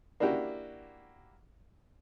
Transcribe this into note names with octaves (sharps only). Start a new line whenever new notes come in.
A#3 D4 E4 F#4 G4